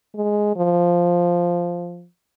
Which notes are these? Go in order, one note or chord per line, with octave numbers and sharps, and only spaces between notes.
G#3
F3